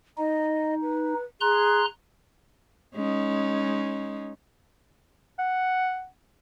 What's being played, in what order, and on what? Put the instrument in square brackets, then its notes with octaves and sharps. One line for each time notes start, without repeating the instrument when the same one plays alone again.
[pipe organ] D#4 [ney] D#5
[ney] B4
[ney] G#4 [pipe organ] A#5 C6 F#6
[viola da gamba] G#3 C#4 D#4
[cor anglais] F#5